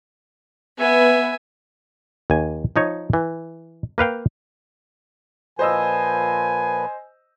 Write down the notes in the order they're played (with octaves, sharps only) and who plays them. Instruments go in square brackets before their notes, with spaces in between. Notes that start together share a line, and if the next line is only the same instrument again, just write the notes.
[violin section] B3 [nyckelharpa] E5 G#5
[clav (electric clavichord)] D#2 G#5
F3 D#4 C#5
E3
A#3 B4 F5 G5
[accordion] A#2 F3 B4 [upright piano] C5 D#5 E6 [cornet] G#5